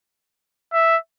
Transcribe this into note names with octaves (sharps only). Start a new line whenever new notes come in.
E5